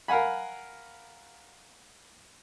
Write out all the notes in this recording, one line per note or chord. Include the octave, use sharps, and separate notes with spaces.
A#4 F5 F#5 G#5 B5